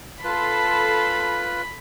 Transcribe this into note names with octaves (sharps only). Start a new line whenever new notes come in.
F4 A4 B4 A5 B5 C6